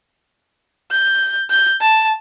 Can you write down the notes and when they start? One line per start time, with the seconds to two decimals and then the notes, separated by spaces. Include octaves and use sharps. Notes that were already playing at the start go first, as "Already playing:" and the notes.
0.91 G6
1.50 G6
1.82 A5